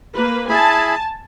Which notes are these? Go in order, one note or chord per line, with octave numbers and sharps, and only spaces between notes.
A#3 B4
E4 G#4 G#5 A5 B5